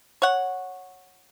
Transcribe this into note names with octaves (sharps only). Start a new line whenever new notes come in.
C#5 F#5